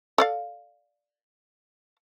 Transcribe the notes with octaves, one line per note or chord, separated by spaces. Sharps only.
A4 D5 F5